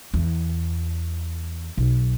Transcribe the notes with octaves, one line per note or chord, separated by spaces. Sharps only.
E2
B1